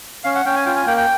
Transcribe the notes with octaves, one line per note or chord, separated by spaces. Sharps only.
C#4 F5
F#5
C#4 G5
G#5
F4 G5
G#5
A#3 G5
G5